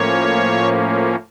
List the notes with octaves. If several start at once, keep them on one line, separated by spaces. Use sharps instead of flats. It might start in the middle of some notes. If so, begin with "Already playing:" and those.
Already playing: A2 F3 A#3 C#4 C#5